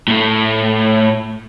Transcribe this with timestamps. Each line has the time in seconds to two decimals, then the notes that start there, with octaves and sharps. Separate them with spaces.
0.08 A2 A3